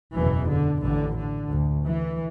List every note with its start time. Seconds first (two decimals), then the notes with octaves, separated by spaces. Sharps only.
0.16 F#1 E2 B2 E3
0.50 D3
0.83 A1 A2 D3
1.17 D3
1.51 D2
1.85 E3